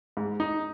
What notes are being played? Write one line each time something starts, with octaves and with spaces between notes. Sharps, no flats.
G#2
D#4